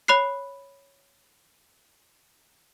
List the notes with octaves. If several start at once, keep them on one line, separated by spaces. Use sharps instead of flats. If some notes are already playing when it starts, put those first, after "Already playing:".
C#5 B5 F#6 C7